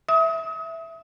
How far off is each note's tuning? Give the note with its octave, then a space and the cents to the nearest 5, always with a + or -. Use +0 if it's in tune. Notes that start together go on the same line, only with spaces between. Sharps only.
E5 +0 D#6 +35